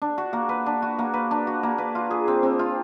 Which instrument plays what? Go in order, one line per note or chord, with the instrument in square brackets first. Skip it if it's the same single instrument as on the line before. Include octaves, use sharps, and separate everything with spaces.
[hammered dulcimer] D4
F#4
A#3
B4
D4
F#4
A#3
B4
D4
F#4
A#3
B4
F4
G#4
C4
C4
F4